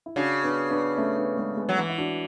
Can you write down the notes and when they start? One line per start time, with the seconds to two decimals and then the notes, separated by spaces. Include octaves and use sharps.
0.06 E4
0.16 C#3 D4 F#4
0.44 B3 D4
0.71 B3 D4
0.97 A3 C#4
1.18 B3 D4
1.37 G#3 B3
1.58 G#3 B3
1.69 F#3
1.78 E3
1.90 E4
1.98 D4 F#4